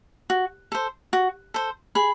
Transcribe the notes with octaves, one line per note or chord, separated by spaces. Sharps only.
F#4
A4 C5
F#4
A4 C5
G#4 B5